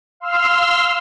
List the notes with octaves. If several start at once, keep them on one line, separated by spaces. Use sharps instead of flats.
F5 C6 E6 F6